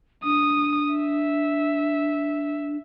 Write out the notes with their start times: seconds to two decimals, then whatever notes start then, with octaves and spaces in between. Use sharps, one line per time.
0.24 D4 D#6
0.93 E5